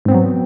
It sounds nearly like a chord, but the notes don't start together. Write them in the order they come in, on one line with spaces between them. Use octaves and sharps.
G#2 C4 B3 F#3